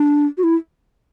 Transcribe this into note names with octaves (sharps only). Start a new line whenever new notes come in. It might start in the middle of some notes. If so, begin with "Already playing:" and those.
Already playing: D4
F#4
E4